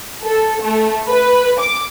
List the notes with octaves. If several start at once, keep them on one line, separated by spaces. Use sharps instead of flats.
A4
A3
B4
D6